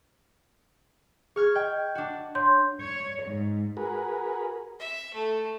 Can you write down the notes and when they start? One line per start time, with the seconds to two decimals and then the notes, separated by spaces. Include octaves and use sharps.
1.36 G#4 C#6 F6 G#6
1.55 D#5 G5
1.95 D4 F#4
2.35 C#5 C6 G6
2.79 C#5
3.24 G#2
3.77 F#4 G#4 A#4 B4
4.80 E5
5.14 A3